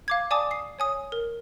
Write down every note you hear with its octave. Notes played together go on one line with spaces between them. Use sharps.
F5 D6 G#6
D5 G#5 A5 D6 D#6
D#6 C7
C#5 G#5 D#6
A#4